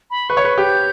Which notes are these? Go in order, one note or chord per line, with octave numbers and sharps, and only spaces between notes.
B5
B4 C#6
C#5
B4
G4 G6